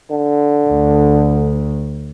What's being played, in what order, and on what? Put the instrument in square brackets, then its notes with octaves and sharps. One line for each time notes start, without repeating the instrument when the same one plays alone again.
[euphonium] D3
[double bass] D2